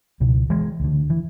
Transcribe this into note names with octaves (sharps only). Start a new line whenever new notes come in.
C#2 B2
E3 G#3
D2 D3
E3